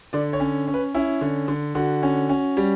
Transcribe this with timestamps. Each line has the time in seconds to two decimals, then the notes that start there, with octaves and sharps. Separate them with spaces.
0.13 D3 D5
0.33 C#5
0.40 C#4
0.67 C#4
0.74 B4
0.94 C#4 E4
1.21 D3
1.48 D3
1.75 D3 F#4
2.03 C#4
2.29 C#4
2.57 G3